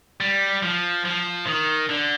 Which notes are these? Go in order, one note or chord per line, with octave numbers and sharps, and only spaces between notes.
G3
F3
F3
D#3
D3